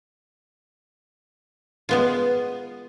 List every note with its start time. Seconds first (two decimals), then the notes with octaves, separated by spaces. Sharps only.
1.89 G#3 B3 F4